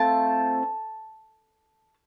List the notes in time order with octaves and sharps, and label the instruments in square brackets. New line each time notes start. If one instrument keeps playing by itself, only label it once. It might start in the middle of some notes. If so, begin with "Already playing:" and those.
Already playing: [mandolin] A3 C4 F4 A5